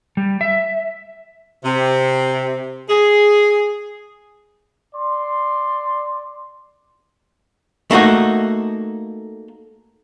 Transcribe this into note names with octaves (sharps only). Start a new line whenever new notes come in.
G3
E5
C3
G#4
D5 C6
A3 A#3 D#4 F#4